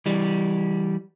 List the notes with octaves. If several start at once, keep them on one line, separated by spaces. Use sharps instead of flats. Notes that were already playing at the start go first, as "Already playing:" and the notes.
E3 G3